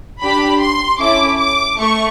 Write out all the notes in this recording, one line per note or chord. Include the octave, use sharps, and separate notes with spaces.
D4 G4 B5
C6
C#4 E4 A4 D6
D6
A3 C#6